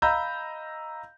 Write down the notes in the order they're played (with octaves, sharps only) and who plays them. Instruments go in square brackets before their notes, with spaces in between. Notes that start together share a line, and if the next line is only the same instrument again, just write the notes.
[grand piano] D#5 F5 A#5 B5 E6 G6